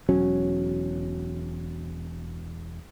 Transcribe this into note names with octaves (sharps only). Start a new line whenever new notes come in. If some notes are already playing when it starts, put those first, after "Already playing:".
E1 F#3 C#4